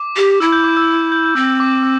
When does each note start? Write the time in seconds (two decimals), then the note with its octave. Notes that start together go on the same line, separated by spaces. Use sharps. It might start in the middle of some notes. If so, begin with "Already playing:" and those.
Already playing: D6
0.16 G4
0.40 E4 E6
0.52 G6
0.64 D6
0.77 E6
1.12 G6
1.26 G6
1.36 C4 E6
1.60 D6
1.83 E6